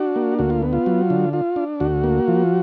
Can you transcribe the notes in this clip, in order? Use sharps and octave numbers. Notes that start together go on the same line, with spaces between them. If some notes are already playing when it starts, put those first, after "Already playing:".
Already playing: D4 F#4
A#3
D2 F#4
F4
B3
F4
F#3
D3
F4
D4
D2 F#4
A#3
F3